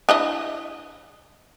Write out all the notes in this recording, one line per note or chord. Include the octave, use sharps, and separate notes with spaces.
D4 E4 D#5